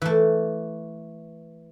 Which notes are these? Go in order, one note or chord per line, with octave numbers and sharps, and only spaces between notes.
E3 A3